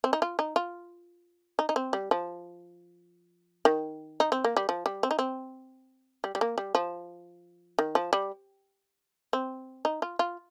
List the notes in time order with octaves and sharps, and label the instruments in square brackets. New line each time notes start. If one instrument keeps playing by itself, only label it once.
[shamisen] C4
D#4
F4
D#4
F4
D#4
D#4
C4
G3
F3
D#3
D#4
C4
A#3
G3
F3
G3
C4
D#4
C4
G3
G3
A#3
G3
F3
D#3
F3
G3
C4
D#4
F4
F4